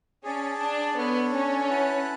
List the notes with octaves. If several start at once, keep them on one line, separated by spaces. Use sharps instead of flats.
C#4 G#4 D5 A5
D4
B3 D4 A4 C#5
C#4
E4 B4 F#5 A5